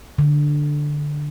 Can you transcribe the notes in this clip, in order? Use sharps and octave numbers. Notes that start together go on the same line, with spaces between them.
D3